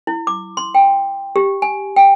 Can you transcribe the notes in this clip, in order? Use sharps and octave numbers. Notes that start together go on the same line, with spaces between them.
E4
D6
C6
G5
G4
G#5
G5